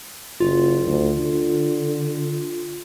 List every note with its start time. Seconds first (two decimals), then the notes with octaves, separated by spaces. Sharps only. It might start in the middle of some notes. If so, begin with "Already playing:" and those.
0.40 F#1 F4
0.86 D2
1.19 D3